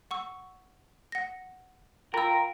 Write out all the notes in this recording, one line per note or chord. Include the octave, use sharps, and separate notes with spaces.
F#5 C#6 E6
F#5 A#6
F4 A#4 G5 B5 E6